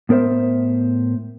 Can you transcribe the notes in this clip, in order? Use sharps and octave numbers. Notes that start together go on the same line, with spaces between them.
A2 B3 A#4 C5 E5